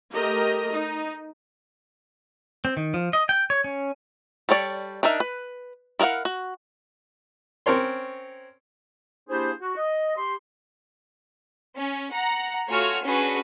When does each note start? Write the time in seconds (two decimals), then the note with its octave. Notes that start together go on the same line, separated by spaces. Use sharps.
0.13 A3 G4 A#4 D#5 A#5
0.73 D#4
2.65 C4
2.77 D#3
2.94 F3
3.13 D#5
3.29 G5
3.50 C#5
3.64 C#4
4.49 G3 A4 C#5 D5
5.03 D4 D#4 A#4 E5
5.20 B4
5.99 E4 A#4 D5 F5 F#5
6.25 F#4
7.66 C4 C#4 A#4 C#5 C6
9.29 A#3 D4 E4 G4 G#4 C5
9.61 F#4
9.77 D#5
10.18 G4 C6
11.76 C#4
12.11 F#5 A#5
12.69 A3 F4 F#4 C#5 G#5 F6
13.04 C#4 D4 F#4 G#4 B4